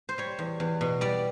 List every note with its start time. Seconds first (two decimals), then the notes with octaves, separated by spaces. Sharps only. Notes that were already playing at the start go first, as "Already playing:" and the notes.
0.09 C5
0.18 G3 C#5
0.39 E2
0.60 E2
0.81 B2
1.01 G3 D5